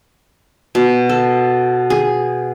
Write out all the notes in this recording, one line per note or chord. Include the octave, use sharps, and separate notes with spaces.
B2
A4
G#4